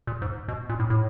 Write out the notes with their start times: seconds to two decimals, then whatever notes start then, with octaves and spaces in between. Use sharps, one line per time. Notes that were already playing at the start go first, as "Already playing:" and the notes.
0.07 A#2
0.22 G#2
0.48 B2
0.69 A#2
0.80 A2
0.90 A2